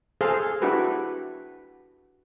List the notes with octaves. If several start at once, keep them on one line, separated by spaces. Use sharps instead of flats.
G#4 A4 C5 F5
D4 E4 F#4 G4 B4